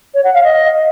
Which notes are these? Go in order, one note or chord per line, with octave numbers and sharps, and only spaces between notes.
C#5
F#5
F5
D#5